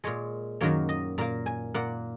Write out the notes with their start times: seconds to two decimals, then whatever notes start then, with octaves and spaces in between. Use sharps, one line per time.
0.04 A#2 G#3 C#5
0.61 F#2 D#3 F#3 A#3 C#5
0.89 D#5
1.18 A#2 A#3 A#5
1.46 G#5
1.74 A#2 A#3 F#5